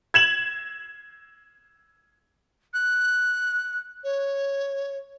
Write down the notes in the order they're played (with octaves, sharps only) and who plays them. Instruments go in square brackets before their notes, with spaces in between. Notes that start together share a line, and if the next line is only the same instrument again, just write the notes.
[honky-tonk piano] G#6 E7 F#7
[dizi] F#6
C#5